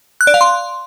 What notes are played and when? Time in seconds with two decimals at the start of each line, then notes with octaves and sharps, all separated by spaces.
0.21 F#6
0.27 D5
0.34 F5
0.41 C6